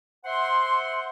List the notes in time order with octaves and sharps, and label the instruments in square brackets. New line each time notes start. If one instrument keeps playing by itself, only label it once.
[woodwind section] C5 E5 F#5 C6